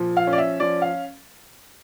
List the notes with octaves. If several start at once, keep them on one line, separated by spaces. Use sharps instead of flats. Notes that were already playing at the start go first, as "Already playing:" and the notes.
Already playing: A#2 F3
F5
C#4
D5
E5
F3 D5
F5